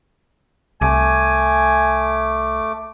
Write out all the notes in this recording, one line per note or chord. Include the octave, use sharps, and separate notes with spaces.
C2 A3 G#5 D6